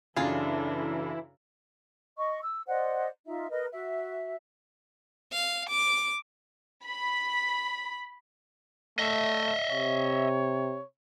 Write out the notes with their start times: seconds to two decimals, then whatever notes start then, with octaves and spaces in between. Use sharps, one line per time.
0.16 F#2 C#3 E3 D4 E4 F4 G#4 A4
2.17 D#5 C#6
2.43 E6
2.67 C5 D5 D#5 F#5
3.26 D#4 F4 E5
3.51 A#4 B4 D#5
3.73 F#4 E5
5.32 F5
5.69 D6
6.85 B5
8.99 A3 D#5 E5
9.70 C3 C#5